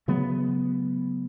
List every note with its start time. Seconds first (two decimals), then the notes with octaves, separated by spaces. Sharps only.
0.08 C#3 F#3 A3 B3